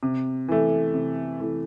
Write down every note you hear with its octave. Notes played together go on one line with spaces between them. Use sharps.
C3
E3 A3
C3
E3 A3